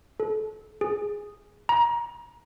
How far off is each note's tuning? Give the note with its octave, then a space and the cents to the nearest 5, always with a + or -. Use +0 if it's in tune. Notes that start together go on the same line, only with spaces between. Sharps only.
A4 -25
G#4 -5
A#5 +25